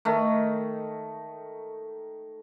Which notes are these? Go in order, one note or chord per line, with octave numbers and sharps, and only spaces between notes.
D#3 A3